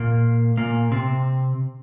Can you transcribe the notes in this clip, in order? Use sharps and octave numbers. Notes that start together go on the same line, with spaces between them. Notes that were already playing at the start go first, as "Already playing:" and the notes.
Already playing: A#2 A#3
A#2 A#3
C3 C4